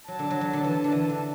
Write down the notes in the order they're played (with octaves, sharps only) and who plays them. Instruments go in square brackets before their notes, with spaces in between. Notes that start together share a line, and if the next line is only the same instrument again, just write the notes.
[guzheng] F#3 [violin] A5
[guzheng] D3
F#3
F#3
D3
E3
D3
E3
D3